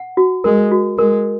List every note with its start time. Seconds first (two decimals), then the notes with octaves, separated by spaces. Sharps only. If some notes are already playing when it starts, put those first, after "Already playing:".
Already playing: F#5
0.17 F#4
0.44 G#3 A#4
0.72 F#4
0.98 G#3 A#4